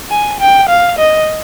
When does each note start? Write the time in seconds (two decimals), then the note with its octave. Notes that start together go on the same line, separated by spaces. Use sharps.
0.10 G#5
0.40 G5
0.69 F5
0.99 D#5